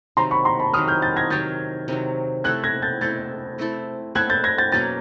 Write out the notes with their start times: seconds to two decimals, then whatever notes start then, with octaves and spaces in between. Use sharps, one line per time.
0.17 C3 D#3 F#3 A#5 C6
0.31 B5 C#6
0.45 A#5 C6
0.60 A5 B5
0.73 C3 D#3 F#3 D#6 F6
0.88 F6 G6
1.02 G6 A6
1.16 G#6 A#6
1.30 C3 D#3 F#3 G6 A6
1.88 C3 D#3 F#3
2.44 A3 C4 E4 A4 F#6 G#6
2.64 G#6 A#6
2.82 G6 A6
3.01 A3 C4 E4 A4 G6 A6
3.58 A3 C4 E4 A4
4.15 A3 C4 E4 A4 F#6 G#6
4.30 G6 A6
4.44 G#6 A#6
4.58 G6 A6
4.72 B2 F#3 A#3 C#4 G6 A6